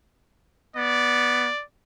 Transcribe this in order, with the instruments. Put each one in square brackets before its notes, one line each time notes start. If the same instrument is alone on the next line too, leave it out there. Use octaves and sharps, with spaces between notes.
[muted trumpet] B3 [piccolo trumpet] D5